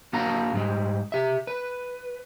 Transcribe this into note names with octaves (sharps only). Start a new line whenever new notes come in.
A#3 D4 F#4 F5 A5 A#5
G#2 G3 G#3
G4 E5
B4